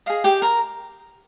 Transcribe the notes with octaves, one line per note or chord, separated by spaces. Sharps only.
G#4 D#5 F5
G4 G5
A#4 A#5